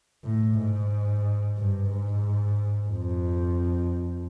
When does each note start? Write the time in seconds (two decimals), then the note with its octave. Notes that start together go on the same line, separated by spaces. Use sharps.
0.25 A2
0.58 G#2
1.57 G2
1.90 G#2
2.89 F2